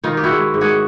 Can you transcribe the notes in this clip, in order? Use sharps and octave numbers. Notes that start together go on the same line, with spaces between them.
D#3 D#4 F4
G4
E4 F#4
G#3
G#2
F#4 G#4